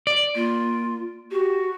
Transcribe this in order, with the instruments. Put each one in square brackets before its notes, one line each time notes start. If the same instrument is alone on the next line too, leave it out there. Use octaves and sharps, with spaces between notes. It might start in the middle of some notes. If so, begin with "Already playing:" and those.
[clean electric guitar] D5
[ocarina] A#3 [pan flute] F4
[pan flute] F#4 [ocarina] G4